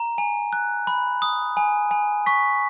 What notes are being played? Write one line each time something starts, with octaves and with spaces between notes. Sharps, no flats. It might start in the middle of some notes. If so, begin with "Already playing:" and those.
Already playing: A#5
G#5
F#6
B5
D#6
G#5
G#5
C#6 B6